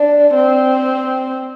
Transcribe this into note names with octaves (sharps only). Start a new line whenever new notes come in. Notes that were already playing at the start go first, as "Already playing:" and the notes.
Already playing: D4
C4